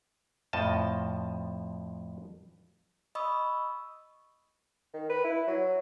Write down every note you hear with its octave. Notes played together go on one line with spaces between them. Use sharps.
F2 A2 F3 D#5 A5
D#5 B5 C#6 D#6 E6
D#3
B4
E4
F#3